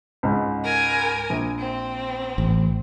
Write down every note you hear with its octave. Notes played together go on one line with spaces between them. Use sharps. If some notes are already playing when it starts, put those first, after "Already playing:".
C#2 G#2
A#4 G#5
A#1
C4
A1